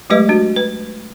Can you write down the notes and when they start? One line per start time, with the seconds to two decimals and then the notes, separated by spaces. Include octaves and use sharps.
0.10 F#3 G#3 A3 G4 B4 D#5
0.29 D4 F#4
0.56 B4